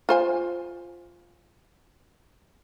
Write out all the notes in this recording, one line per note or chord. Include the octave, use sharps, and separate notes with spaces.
F4 C5 G#5